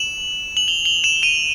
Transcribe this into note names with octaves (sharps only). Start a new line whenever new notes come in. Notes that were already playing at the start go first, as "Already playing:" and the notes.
Already playing: E7 F#7
F#7
F7 G7
F7 G7
E7 F#7
D#7 F7